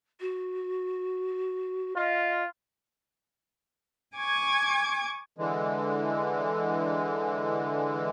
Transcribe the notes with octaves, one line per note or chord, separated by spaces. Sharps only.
F#4
F4 D#5
G#5 C#6 D6 G#6
D3 E3 G#3